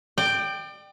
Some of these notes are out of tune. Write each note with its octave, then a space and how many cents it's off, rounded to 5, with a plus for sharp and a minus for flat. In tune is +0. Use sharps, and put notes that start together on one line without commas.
D5 +35 G5 +0